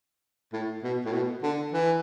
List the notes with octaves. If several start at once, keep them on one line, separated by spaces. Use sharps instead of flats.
A2
B2
A2
B2
D3
E3